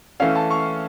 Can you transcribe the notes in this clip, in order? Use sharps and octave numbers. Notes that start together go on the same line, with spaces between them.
E3 A3 C#4 F5
A5
C#6